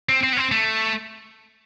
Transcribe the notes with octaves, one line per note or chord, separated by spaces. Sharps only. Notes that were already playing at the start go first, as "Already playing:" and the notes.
C4
C4
B3
C4
A3